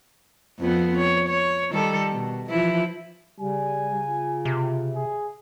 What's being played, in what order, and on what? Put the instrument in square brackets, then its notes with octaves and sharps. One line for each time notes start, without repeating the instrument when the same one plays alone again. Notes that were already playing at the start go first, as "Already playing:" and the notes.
[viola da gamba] F2 B3 C4
C#5
C#5
D#3 G3 A4
B2
E3 F3 E4
[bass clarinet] C#3 [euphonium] G3 [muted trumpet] G#5
[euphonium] F4
[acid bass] C3
[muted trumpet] G#4